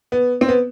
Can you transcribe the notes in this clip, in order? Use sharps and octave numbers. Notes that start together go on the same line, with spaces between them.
B3
C4
B3